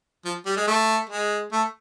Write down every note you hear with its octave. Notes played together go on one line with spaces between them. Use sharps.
F3
G3
G#3
A3
G#3
A3